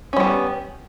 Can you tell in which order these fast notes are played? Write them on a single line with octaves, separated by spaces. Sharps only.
C#4 G3 B3